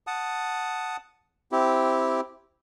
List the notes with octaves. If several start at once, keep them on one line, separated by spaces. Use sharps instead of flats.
F#5 A5 D#6
C4 E4 G4